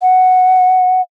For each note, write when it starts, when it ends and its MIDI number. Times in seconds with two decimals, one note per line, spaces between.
0.02 1.01 78